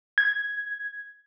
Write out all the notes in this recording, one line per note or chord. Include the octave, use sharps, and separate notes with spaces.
G#6